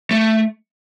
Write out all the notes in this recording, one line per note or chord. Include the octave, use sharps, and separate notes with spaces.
A3